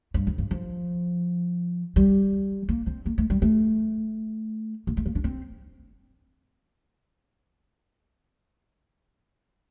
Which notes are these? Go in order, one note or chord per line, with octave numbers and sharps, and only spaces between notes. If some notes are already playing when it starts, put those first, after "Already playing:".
G2
F2
G2
F3
G3
A#3
C4
A#3
A3
G3
A3
A#3
A3
A#3
D4
C4